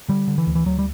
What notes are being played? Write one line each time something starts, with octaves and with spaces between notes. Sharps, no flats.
D3 G3
D3
E3
D2
E3
D2 F#3
G3